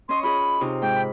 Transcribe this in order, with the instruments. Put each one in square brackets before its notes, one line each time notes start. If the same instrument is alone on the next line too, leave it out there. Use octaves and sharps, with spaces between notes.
[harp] C#4 D#5 C#6 [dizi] C6
[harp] F4 G#4 D#5 [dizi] B5
[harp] C3 D#4 F4
[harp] G#2 [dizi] G5
[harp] B5